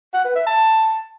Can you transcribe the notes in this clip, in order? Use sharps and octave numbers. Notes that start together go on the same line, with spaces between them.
F#5
B4
E5
A5